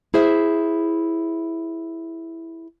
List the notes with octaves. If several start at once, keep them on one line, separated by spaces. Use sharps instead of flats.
E4 G#4 C5 E5